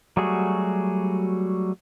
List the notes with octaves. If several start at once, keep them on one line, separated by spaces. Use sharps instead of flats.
F#3 G3 A3 F#4 G#4